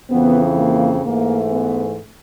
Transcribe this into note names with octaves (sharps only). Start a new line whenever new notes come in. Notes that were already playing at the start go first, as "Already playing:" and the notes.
F2 C#3 E3 B3
A#3
G#2 E3 A3 A#3
B3